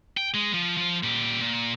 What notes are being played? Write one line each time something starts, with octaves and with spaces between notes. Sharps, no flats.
G5
G#3
F3
F3 F4
A#2 G4
A#2